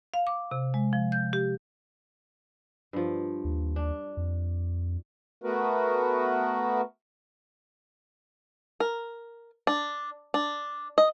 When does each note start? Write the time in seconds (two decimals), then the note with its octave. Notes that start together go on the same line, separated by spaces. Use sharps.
0.14 F5
0.27 D6
0.51 C3
0.74 G#3
0.93 F3
1.12 G6
1.33 G4
2.93 G2 F3
3.44 D#2
3.76 D4
4.17 F2
5.42 A3 B3 F#4 A#4 B4
8.80 A#4
9.67 D4
10.34 D4
10.98 D#5